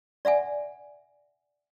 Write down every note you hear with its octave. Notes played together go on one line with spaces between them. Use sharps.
D5 E5 F#5 G#5